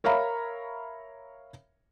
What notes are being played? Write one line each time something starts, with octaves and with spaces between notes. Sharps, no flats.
A#4 C#5 E5 F5 A#5 B5